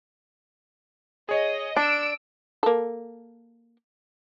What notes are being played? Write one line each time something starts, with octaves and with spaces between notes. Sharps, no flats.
G#4 C#5 D#5
D4 D6 E6 D7
A#3 A4